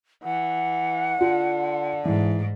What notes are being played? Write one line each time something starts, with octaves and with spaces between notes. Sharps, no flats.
E3 F#5
D3 F4
G#2 E3